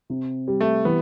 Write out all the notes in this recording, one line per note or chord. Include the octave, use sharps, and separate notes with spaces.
C3
G3
A3
E3 B3